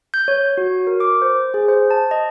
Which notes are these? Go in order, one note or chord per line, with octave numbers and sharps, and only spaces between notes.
G6
C#5
F#4
A#4
D6
C5
G#4
C5
A5
D#5